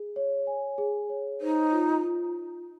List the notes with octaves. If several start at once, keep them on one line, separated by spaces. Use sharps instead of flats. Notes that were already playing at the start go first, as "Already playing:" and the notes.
Already playing: G#4
C#5
G#5
G#4
C#5
D#4 C5
F4
F4
F4